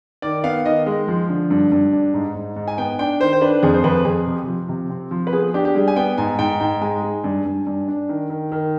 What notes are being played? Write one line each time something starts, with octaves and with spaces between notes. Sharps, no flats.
D#3 D5
B3 F5
D#3 D#5
G#3
F3
D3
G2
G2
D4
G#2
G#2
G#2
G#5
B3 G5
D4 G5
D#3 C5
C5
D4 B4
F2 G#4
C5
F2 B4
F2 G#4
C3
F3
C3
C4
F3
B4
B3 G#4
D4 G4
G4
G3 G#4
G#5
B3 G5
G#2 G#5
G#2 G5
G#2 G5
G#3 G#5
G#3
G2
G2
G2
D4
D#3
D#3
D#3